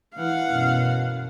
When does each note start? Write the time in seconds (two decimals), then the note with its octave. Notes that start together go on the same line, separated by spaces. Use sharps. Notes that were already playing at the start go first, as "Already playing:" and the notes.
0.16 E3 F5 F#5
0.50 F#2 B2